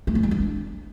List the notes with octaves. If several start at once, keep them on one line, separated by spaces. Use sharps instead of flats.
A3
C#4
G#3
D4